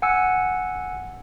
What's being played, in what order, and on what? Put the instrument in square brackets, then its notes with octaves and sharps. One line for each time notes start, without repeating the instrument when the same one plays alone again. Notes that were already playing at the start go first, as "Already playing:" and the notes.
[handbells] F#5 G#5 E6 C#7